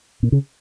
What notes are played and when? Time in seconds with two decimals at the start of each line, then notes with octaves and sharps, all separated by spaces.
0.23 A#2
0.32 C#3